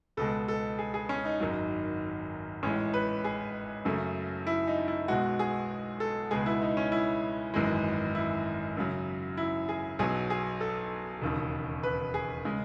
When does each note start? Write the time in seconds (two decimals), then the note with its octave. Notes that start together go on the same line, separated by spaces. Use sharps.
0.17 C#2 B2 G#3 A4
0.48 A4
0.79 G#4
0.94 G#4
1.09 C#4
1.25 D#4
1.40 G#1 F#2 D#3 F#3
2.63 A1 A2 G#3 C#4
2.94 B4
3.24 G#4
3.85 F#2 C#3 F#3 A3
4.47 E4
4.67 D#4
4.88 E4
5.08 B1 B2 G#3 F#4
5.39 G#4
6.00 A4
6.31 C#2 B2 G#3 G#4
6.46 E4
6.62 D#4
6.77 C#4
6.92 E4
7.54 G#1 F#2 E3 G#3
8.15 E4
8.77 F#2 C#3 F#3
9.37 E4
9.69 G#4
9.99 B1 B2 F#3 G#4
10.30 G#4
10.61 A4
11.22 E1 D#2 C#3
11.83 B4
12.14 G#4
12.45 C#3 G#3